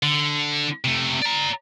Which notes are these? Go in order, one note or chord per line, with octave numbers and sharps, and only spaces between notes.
D3
C3 A3
D5 A#5